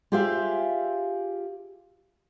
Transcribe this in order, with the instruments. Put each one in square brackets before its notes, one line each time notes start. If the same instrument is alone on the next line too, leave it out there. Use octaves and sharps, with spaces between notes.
[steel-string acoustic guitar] F4 G4 G#4 C5 E5 F5